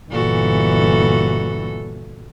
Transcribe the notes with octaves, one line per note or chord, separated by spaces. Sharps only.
G1 A#2 E3 F#4 A4